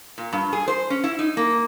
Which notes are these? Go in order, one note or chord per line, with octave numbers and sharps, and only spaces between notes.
A#2
G2
G#4
C5
C#4
E4
D#4
A#3